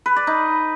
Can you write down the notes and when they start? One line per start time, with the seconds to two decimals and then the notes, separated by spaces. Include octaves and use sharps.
0.06 B4
0.16 D5
0.27 D#4